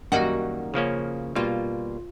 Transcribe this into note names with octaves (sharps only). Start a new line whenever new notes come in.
F#2 D#3 G3 A#3 D#4 F#4
C#3 F3 A#3 C#4
B2 G3 A#3 F4